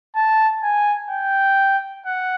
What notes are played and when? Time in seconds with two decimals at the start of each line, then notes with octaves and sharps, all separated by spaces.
0.16 A5
0.63 G#5
1.10 G5
2.06 F#5